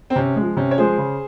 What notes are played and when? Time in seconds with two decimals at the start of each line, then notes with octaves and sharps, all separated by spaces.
0.10 C4
0.16 C3 C#4
0.36 F3 G#3
0.56 C3 C#4
0.71 C#5
0.77 F3 G#3 G#4 C5
0.98 C#3